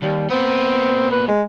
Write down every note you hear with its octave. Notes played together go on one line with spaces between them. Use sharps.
D#2 G3
A#2 B3 C4
B4
G#3